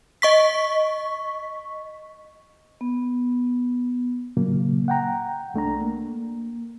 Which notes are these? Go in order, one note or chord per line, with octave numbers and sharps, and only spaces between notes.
D#5 C#6 B6
B3
A#2 C#3 F#3 A#3
F#5 G5 A#5
C2 A3 D4 A#5
A#3